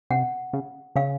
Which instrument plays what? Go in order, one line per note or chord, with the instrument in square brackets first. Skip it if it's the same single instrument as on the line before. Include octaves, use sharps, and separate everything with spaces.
[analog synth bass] C3 [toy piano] F#5
[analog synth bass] C#3
[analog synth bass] C#3 [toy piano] F5